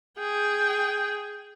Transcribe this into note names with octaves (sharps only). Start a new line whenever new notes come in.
G#4 G5